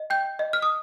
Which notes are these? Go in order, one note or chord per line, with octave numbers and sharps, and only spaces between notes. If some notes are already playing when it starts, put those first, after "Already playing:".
Already playing: D#5
G5 G6
D#5
F6
D#6